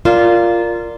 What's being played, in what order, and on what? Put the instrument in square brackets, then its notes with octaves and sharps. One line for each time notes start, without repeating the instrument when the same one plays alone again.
[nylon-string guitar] F4 [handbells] A#4 D5